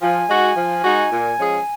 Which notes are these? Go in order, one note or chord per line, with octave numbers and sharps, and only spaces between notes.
F3 G#5
G#3 D#4 F#4
F3
G#3 D#4 F#4
A#2
F3 G#3 C#4 G#4